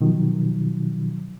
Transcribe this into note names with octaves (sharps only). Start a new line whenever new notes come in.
B2 D#3 F3 F#3